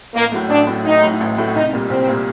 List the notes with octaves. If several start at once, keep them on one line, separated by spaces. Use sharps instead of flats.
A1 A#3
A2 F#3 A3
A1 D4
A2 F#3 A3
A1 D#4
A2 F#3 A3
A1
A2 F#3 A3
C2 D#4
A#2 G3 A#3
C2 C4
A#2 G3 A#3